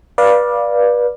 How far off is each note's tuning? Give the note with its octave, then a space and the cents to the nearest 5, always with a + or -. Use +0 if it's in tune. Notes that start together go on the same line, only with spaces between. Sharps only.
B4 -25 D5 +5 F5 +0